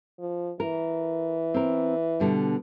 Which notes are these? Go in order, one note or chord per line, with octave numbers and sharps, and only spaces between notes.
F3
E3 A#4
C4 A#4
B2 D3 G3